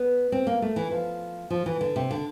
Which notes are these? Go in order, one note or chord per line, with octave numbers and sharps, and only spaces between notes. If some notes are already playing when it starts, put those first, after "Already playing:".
Already playing: B3
C4
A#3
A3
E3
F3
F3
E3
D3
C3
D3